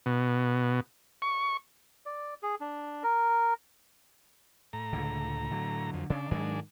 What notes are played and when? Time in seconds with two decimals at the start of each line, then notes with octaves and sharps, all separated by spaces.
0.06 B2
1.22 C#6
2.06 D5
2.43 G#4
2.61 D4
3.03 A#4
4.73 A2 A#5
4.93 C#2 D3
5.51 D3 F#3
5.94 F2
6.10 C#3 C#4 D4
6.31 G#2 D#3 F#3 G#3 D4